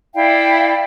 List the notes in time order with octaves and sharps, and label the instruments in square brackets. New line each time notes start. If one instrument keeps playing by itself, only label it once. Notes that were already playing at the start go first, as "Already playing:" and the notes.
[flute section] E4 D5 F5 G5